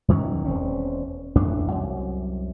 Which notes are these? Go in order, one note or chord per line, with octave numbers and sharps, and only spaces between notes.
E2 D#3 F#3 C#4
E1 C4 C#4
A1 F2 D4
C2 F#2